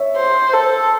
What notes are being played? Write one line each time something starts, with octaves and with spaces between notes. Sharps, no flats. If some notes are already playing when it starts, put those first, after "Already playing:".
Already playing: C#5 E5
C5
A4